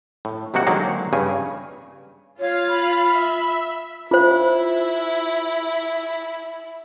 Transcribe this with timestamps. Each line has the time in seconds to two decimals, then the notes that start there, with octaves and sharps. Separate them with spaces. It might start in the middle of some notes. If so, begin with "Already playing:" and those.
0.25 A2
0.54 D#2 C3 D#3 A#3 F#4 F#5
0.67 D3 D#3 F#3 G#3 A#3
1.13 G2 C#3 G#5
2.40 F4 C#5 F5
2.69 B5
3.15 E5
4.11 E4 F4 C5